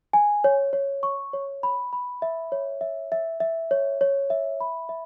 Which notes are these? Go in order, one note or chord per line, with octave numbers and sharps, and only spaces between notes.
G#5
C#5
C#5
C#6
C#5
B5
B5
E5
C#5
E5
E5
E5
C#5
C#5
E5
B5
E5